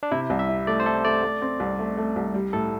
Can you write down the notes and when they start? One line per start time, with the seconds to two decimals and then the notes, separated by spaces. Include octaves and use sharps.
0.03 D4
0.11 C3 E4
0.30 C2
0.39 E5
0.49 E4
0.67 A3 D5
0.80 C5
0.86 E4 A4
1.05 A3 D5
1.23 A3
1.42 C4
1.60 C2
1.79 A3
1.97 A3
2.16 C2
2.34 G3
2.53 A2 A4